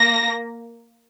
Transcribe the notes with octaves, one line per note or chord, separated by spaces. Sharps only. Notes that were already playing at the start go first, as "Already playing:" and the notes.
Already playing: A#3 A#6